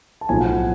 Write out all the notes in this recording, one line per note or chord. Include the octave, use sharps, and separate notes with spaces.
A5
B1 A2 F3 G#5
F#5